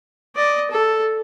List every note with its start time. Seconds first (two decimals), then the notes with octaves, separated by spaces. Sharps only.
0.35 D5 D#5
0.71 A4